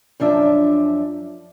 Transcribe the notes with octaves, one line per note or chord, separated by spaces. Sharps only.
F#2 F3 D4 E5